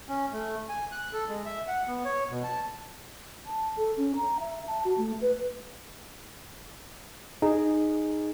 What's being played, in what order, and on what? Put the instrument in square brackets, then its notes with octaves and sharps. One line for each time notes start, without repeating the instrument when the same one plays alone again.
[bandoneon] C#4
A3
G#5
F#6
A4
G#3
E5
F#5
B3
C#5
B2
A5
[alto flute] A5
A4
C#4
A#5
E5
A5
F#4
A3
B4
[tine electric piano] D#4 G#4